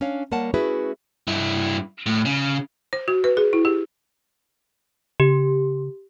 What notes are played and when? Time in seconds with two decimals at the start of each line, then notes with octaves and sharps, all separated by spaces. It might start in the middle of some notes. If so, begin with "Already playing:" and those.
0.01 C#4 D4 C#5 F5
0.31 G3 A#3 A#4 C#5 F#5 A5
0.54 A3 C#4 E4 F#4 G#4 B4
1.28 G2 E4
2.06 A2
2.25 C#3
2.93 C5
3.08 F#4
3.24 B4
3.37 G#4
3.53 E4
3.65 G4
5.20 C#3 G4